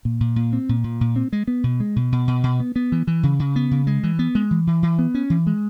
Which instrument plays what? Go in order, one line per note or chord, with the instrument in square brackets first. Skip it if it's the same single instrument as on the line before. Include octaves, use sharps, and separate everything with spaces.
[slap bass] A#2
A#2
A#2
C4
A#2
A#2
A#2
C4
G#3
B3
B2
G#3
B2
B2
B2
B2
B3
B3
E3
E3
C#3
C#3
B3
C#3
G#3
E3
B3
G#3
E3
E3
E3
B3
C#4
E3
G#3